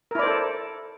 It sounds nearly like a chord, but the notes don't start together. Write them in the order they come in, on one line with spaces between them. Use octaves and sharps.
A#4 E4 D5 C5 A4